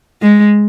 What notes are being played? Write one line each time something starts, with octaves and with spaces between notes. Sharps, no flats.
G#3